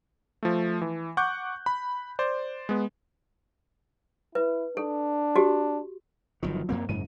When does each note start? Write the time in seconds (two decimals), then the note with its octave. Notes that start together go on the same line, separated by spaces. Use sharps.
0.43 F3 A3
0.82 E3
1.17 F#5 C#6 D6 F#6 G6
1.66 B5
2.19 C5 D5
2.69 G#3 B3
4.35 E4 B4
4.77 D4 A4
5.36 F#4 G4
6.43 G1 D#3 F3 F#3
6.69 F#2 A#3 C4
6.89 F#1 G#2 D#7